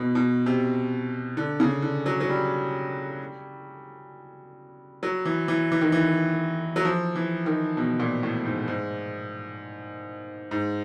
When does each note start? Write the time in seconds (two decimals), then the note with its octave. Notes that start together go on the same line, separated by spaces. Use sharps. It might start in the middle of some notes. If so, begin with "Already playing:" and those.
Already playing: B2
0.15 B2
0.46 C3
1.37 D3
1.60 C#3
1.82 D3
2.06 F#3
2.20 F#3
2.29 G3
5.03 F#3
5.25 E3
5.48 E3
5.72 E3
5.81 D#3
5.92 E3
6.76 F#3
6.85 F3
7.15 E3
7.46 D#3
7.77 B2
7.99 A#2
8.23 A2
8.45 G#2
8.68 G#2
10.51 G#2